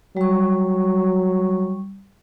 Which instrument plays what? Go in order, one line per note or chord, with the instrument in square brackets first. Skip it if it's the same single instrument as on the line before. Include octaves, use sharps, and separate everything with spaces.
[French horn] F#3 [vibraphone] G3 C#6